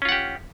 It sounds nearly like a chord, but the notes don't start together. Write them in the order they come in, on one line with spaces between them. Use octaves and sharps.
C#4 F4 F#5 G4